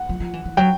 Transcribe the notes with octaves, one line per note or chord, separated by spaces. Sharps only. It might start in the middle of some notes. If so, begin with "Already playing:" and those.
Already playing: F#5
F3
F3
E3
E3
F#3 G5